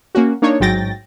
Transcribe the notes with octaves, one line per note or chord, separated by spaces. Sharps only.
A#3 C#4 F#4
A#3 D4 D#4 C#5
A1 G#2 F#3 G5 A6 A#6